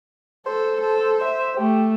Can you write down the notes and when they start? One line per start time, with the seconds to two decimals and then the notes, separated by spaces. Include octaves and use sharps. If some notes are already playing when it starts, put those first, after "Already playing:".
0.46 A4 C5
0.81 A4
1.24 E5
1.57 A3 G4